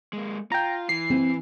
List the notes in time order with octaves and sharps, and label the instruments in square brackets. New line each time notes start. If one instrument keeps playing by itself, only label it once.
[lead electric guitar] G#3 A#3
[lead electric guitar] F4 [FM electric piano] G5 A#5
[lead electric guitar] E3 [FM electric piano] C7
[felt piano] C4